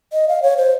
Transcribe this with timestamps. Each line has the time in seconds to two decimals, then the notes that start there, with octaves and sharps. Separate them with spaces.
0.13 D#5
0.28 F5
0.43 C#5
0.57 C5